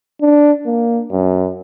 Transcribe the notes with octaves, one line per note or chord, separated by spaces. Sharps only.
D4
A#3
F#2